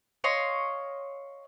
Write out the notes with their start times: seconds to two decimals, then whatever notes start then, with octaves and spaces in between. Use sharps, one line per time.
0.24 C#5 D#5 F5 C6